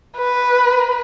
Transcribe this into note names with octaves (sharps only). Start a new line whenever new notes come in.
B4